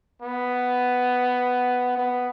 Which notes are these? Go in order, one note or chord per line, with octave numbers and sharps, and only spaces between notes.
B3
B3